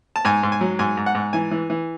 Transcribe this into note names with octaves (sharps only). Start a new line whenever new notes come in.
A5
G#2 G#5
G#2
G#5
F#3
G#2 G#5
G#2
F#5
G#2
E3 G#5
E3
E3